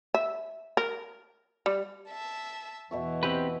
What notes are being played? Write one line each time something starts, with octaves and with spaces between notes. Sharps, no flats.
E5
A#4
G3
E5 A5
E2 B2 E3 E5 C#6
C4 G4 B4